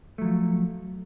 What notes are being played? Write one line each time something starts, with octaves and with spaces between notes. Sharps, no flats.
F3 F#3 A3